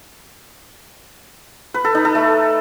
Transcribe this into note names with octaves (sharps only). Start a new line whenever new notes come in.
B4
A4
D#4
A4
A3